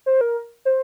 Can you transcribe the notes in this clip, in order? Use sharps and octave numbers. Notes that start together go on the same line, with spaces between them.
C5
A#4
C5